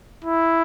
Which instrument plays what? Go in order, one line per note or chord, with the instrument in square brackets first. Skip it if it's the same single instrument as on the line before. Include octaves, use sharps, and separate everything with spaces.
[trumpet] E4